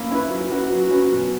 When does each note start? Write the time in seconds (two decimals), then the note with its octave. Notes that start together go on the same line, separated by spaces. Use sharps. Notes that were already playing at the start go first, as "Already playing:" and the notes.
Already playing: A#3 C#4 E4
0.11 C#4 E4 B4
0.31 F#3
0.51 C#4 F#4 B4
0.71 F#3
0.91 C#4 F#4 B4
1.12 B2